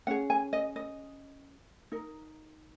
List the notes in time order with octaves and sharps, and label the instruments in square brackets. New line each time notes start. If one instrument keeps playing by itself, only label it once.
[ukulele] C#4 G#4 F#5
G#5
D#5
D#5
D#4 A#4